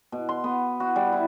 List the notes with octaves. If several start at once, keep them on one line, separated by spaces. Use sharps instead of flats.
B2
C6
B3
F#4
G3
E4